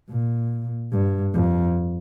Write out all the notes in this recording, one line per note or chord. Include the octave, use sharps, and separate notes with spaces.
A#2
G2
F2